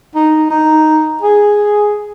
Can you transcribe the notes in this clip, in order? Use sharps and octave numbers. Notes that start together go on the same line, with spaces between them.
D#4
D#4
G#4